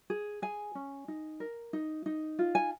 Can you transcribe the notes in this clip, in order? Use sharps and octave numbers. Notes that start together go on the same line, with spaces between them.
G#4
G#4 G#5
C#4
D#4
A#4
D#4
D#4
F4
G#5